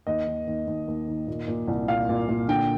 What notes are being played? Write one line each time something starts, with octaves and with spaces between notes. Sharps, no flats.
D#2 D#5
D#3
D#2
D#2
D#2
D#3
A#2
A#2
C2
A#2 F5
A#2
A#2
D3 G5